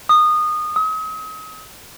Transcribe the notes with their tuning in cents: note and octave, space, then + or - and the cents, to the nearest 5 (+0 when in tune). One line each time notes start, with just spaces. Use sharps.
D#6 -20
D#6 +40